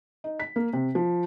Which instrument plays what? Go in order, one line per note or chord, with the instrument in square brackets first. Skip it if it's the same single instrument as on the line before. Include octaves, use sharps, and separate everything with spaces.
[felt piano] D#4
B6
A#3
C3
F3